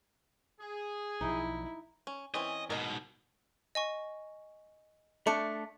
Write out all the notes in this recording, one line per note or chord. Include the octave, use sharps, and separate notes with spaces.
G#4
B1 F3 D#4 E4
C#4
E3 C4 C#4 D#5
G#2 B2 A#4 D#5
D#5 G#5 C#6
A3 D4 C#7